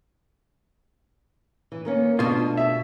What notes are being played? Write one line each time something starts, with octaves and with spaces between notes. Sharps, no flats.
E3
D#3 A#3 C#4
B2 A3 D4 F4
E5